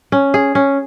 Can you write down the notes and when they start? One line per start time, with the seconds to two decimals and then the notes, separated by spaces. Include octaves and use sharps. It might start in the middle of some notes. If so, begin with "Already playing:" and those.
0.12 C#4
0.34 G#4
0.55 C#4